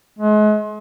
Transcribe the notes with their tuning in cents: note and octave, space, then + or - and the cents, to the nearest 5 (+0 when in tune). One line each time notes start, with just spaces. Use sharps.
G#3 +40